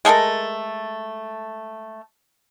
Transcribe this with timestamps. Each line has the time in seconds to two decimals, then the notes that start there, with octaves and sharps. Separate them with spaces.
0.05 G#3 A3 A4 A#4